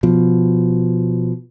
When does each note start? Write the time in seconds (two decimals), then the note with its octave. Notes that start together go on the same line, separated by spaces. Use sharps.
0.03 B2 F3